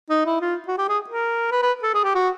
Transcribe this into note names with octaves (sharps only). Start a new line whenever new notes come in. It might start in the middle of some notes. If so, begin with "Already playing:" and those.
D#4
E4
F4
F#4
G4
G#4
A#4
B4
B4
A4
G#4
G4
F#4